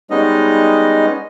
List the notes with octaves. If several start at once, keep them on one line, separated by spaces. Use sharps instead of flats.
G3 G#3 B3 C#4 D#4 D#5